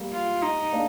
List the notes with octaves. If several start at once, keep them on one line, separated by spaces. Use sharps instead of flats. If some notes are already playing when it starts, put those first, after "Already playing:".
Already playing: G3 A#3
F4
D#4
A#3 D4